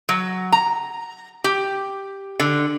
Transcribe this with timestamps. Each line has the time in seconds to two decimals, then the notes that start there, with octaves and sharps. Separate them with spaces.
0.09 F#3
0.52 A#5
1.44 G4
2.40 D3